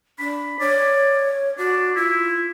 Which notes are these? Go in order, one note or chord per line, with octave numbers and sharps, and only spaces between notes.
D4 B5
C#5 D5
D4 F#4
E4 F4